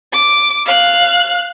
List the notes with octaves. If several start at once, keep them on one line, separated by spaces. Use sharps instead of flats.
D6
F5 F#6